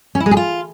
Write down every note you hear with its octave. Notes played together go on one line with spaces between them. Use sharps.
C#4
E4
G#3
G#4
F4